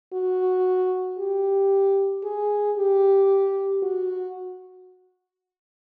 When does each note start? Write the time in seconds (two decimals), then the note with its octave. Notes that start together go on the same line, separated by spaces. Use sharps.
0.13 F#4
1.18 G4
2.24 G#4
2.77 G4
3.83 F#4